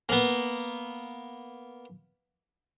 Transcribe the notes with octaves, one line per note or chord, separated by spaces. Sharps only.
A#3 B3